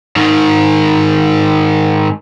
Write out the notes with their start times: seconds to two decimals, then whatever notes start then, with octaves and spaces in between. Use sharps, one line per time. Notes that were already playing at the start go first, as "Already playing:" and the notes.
0.16 G#2 D#3